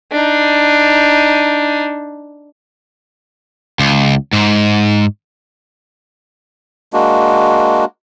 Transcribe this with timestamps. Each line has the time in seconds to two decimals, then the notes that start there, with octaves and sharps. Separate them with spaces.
0.12 D4 D#4
3.79 C#2
4.33 G#2
6.93 G#3 A#3 D4 F#4